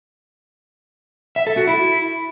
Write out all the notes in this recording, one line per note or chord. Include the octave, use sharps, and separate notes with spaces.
E5
A4
F#4
E4